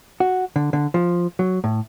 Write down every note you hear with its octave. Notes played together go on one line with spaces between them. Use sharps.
F#4
D3
D3
F3
F#3
A2